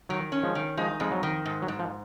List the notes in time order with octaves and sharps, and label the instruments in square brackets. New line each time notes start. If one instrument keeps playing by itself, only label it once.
[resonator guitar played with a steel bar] D#3 [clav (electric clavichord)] F#3
[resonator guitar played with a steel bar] C#4
[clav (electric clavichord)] F3 G#3
[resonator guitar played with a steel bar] D#3
[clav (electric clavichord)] F3 G#3 [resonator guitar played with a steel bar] D#4
[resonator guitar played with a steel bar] F2 [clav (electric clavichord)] G#3
[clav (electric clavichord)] F#3
[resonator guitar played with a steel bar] D#3
G#2
[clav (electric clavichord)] F#3
[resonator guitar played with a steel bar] G#2
[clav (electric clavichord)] F3